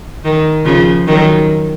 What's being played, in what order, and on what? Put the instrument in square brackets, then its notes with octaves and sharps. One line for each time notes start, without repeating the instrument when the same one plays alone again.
[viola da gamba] D#3
C#3 F3
D#3 F#3